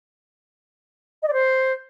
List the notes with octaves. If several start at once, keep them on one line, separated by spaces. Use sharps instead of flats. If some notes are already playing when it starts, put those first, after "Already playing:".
D#5
D5
C5